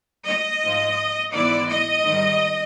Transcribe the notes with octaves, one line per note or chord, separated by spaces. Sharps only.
D#5
G#2 F3 G#3
G#2 E3 G#3 B3 E4 D5
D#5
G#2 D#3 G3